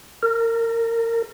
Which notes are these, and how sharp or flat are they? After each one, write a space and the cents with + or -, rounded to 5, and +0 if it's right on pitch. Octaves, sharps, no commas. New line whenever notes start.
A#4 -25